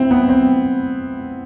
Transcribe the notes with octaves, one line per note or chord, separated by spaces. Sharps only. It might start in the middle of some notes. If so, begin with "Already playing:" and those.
Already playing: C4 E4
B3
C4